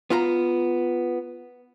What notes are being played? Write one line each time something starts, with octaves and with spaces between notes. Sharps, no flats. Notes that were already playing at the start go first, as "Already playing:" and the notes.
B3 F4 A#5